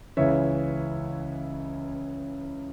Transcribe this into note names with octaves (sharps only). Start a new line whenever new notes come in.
C#2 C#3 E3 C#5 E5